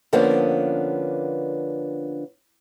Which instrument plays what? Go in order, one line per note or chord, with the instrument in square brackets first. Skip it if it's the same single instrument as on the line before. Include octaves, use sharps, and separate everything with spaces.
[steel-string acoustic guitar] D3 F3 A#3 B3 C#4 D4